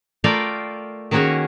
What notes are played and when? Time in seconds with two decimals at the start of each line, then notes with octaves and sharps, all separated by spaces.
0.24 A3 F4 A#4 D5 F5 G5
1.11 D#3 A#3 C#4 F#4 G#4 C#5